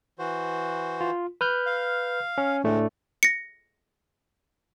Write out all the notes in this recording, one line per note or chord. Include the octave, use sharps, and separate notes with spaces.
E3 F#4 C5
F4
B4 F6 G6
F5
C#4
D2 A2 G#3 A3 D4
A#6 C#7